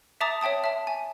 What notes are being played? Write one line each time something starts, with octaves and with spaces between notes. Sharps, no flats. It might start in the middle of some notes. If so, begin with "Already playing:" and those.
E5 A5 A#5 D6 D#6 A6
C#5 E5 G5 A5 D#6
E5 A5
G#5